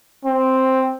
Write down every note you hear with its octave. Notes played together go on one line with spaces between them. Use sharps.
C4